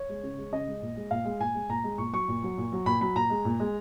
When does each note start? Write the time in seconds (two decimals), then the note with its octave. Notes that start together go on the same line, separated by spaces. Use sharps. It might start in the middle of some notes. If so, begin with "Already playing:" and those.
Already playing: C#5
0.09 G#3
0.23 C#3
0.38 G#3
0.52 C#3 D#5
0.67 G#3
0.82 A#2
0.96 G#3
1.11 A#2 F5
1.25 G#3
1.40 A#2 G#5
1.54 G#3
1.69 A#2 A#5
1.84 G#3
1.98 A#2 C#6
2.12 F#3 C#6
2.28 A#2
2.43 F#3
2.57 A#2
2.72 F#3
2.86 A#2 B5
3.01 F#3 B5
3.15 A#2 A#5
3.30 G#3
3.45 A#2
3.60 G#3